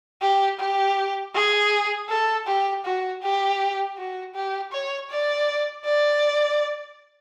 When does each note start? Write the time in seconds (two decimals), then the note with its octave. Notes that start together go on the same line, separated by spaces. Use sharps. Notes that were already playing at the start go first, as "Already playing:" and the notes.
0.22 G4
0.60 G4
1.35 G#4
2.09 A4
2.47 G4
2.85 F#4
3.22 G4
3.97 F#4
4.35 G4
4.72 C#5
5.10 D5
5.85 D5